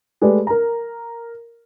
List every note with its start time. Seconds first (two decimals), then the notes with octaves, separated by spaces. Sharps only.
0.21 G#3 A3 G4 G#4 B4 D5
0.47 A#4 A#5